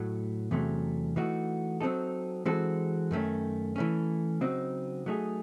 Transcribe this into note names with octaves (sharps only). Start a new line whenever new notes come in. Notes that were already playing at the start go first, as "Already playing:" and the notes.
Already playing: A2 F#3 A3
E2 C3 F#3 A3 C#4
E3 A3 D#4 F#4
F#3 C4 D#4 A4
E3 G#3 C4 F#4 A4
F#2 D#3 A3 C#4
E3 A3 C#4
C#3 F#3 C4 D#4
F#3 A3 D#4 G#4